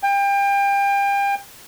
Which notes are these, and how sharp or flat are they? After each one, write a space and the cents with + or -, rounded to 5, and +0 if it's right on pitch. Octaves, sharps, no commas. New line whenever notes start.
G5 +30